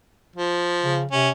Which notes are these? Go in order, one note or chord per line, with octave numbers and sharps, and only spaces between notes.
F3
C#3
C3 C#4